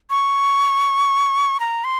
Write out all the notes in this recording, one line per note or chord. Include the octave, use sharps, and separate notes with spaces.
C#6
A#5
C6